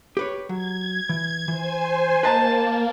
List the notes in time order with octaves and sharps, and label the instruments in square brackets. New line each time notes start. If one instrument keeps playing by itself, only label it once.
[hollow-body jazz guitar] G4 B4 C#5
[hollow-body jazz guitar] F#3 [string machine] G#6
[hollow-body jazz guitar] E3
[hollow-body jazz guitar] E3 [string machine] C5 G#5
[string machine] A#3 [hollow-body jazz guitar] B4 D#5 A#5 [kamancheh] A5